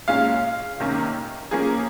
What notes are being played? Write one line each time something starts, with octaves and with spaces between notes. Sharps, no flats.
A#2 G#3 C#4 F5
C3 D#3 A#3 C#4
F3 A#3 C#4 G#4